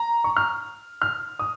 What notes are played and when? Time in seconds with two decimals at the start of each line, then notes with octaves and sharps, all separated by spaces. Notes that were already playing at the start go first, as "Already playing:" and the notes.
Already playing: A#5
0.24 C#6
0.37 F6
1.02 F6
1.39 D#6